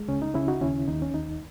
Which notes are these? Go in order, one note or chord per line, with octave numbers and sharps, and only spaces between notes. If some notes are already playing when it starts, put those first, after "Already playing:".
Already playing: G#3
C#2 C#4
D#4
C#3 C#4 E4
D#4 F#4
D#2 C#4 E4
D#2 D#4
C#4
D#2 D#4